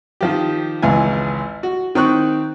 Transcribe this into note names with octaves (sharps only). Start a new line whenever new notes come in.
D#3 F3 G4
G#1 C#2 E3 G#5
F#4
D#3 C4 C#6 F#6